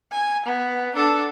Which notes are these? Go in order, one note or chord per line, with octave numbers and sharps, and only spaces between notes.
G#5
B3
D4 A4